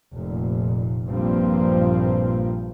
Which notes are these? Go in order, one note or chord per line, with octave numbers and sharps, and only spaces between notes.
F1 A#2
A#1 G2 A#2 F3 A#3 C4